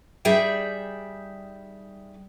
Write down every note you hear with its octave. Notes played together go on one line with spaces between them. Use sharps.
G3 D#4 G#4 D5 E5 G5